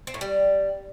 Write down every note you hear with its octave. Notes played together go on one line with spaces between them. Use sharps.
C4
A2
G3